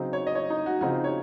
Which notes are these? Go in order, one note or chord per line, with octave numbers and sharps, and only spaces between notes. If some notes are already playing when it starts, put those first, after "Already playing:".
Already playing: C#3 F#3 C4 D#4
C#5
D#5
C#5
D#4
F#4
C#3 F3 C4 D#4 F#4
C#5